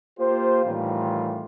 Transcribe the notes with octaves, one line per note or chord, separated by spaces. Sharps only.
A#3 F4 G4 C5
A2 D#3 E3 G3 C4 F4